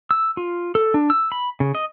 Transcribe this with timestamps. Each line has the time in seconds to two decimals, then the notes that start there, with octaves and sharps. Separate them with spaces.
0.11 E6
0.37 F4
0.75 A4
0.94 D4
1.10 E6
1.32 B5
1.60 C#3
1.75 D#5